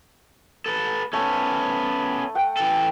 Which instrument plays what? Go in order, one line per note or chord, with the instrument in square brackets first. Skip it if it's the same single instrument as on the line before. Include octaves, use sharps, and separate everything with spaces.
[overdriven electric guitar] A4 B4
[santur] A3 [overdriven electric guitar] B3 C#4
[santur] F#5 G5
[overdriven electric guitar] E3 A4